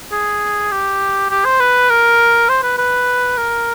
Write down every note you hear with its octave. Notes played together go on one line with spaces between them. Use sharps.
G#4
G4
G4
C5
B4
A#4
C5
B4
B4
A#4